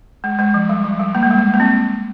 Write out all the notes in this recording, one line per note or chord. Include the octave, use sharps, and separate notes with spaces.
G#3
G#3
F3
G3
F3
G3
A#3
G#3
G3
G#3
A#3
C4